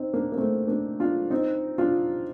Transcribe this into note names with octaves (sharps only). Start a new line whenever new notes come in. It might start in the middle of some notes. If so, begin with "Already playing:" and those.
Already playing: C4 D#4
A#3 D4
A#3
A3 C4
A#3 D4
D4 F4
C4 D#4
D4 F4